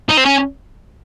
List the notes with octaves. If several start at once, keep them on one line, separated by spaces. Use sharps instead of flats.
D#4
C4
C#4